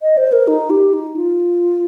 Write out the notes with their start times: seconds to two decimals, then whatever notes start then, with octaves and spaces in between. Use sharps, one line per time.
0.02 D#5
0.17 C5
0.32 A#4
0.48 D#4
0.70 G4
0.93 D#4
1.17 F4